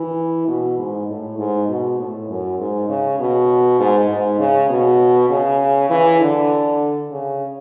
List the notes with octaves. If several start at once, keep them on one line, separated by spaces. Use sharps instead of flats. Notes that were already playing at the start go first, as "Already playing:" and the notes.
Already playing: E3
B2
G#2
A2
G#2
B2
A2
F#2
G#2
C#3
B2
G#2
G#2
C#3
B2
C#3
E3
D3
C#3